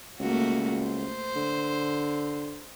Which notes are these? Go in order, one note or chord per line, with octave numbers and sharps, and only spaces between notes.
C#2 A3 A#3 F#4
C5
D3